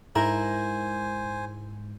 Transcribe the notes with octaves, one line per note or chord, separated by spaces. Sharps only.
G#2 E4 A#4 C5 G#5